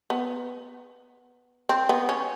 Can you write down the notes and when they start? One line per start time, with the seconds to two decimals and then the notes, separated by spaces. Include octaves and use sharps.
0.10 B3
1.69 C4
1.89 B3
2.09 C#4